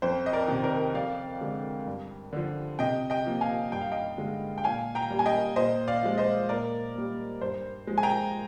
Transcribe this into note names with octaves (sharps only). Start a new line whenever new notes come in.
F2 C5
D#5
A#4 D5
C3 D#3
A#4 D5
F2 D5 F5
D3 G#3
G2
D3 F3
C3 D#5 G5
D#5 G5
F3 A#3
F5 G#5
G2 G5
F5
D#5 G5
D3 G#3
G5
A#2 F5 G#5
G5 A#5
G3 A#3
G#5
D#5 G5
A#2 C5 D#5
D5 F5
F3 G#3
C5 D#5
A#2 A#4 D5
G3 A#3
G2 C5
F3 G#3
G#5
G5 A#5